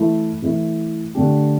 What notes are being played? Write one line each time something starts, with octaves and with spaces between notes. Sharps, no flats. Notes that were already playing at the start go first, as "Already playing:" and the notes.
Already playing: E3 A3 E4
E3 A3 E4
D3 A3 D4 G4